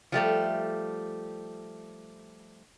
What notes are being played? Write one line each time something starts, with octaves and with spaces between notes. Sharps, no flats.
F3 G3 A3 G4